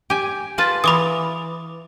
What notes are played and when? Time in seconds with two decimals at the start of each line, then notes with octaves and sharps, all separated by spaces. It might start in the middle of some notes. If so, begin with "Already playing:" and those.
0.10 G4 G#5
0.58 F4 B4 A5
0.84 E3 B5 D6 D#6